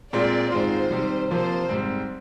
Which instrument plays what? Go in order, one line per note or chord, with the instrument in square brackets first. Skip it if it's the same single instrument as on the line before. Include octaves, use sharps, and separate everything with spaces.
[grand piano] A#2 G#3 C4 F4 [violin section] D5
[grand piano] G#2 D#3 G#3 C4 F4 [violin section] C5
[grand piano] C3 D#3 G3
[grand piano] C3 F3 A#3 F4 [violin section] C5
[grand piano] G#2 G3 C4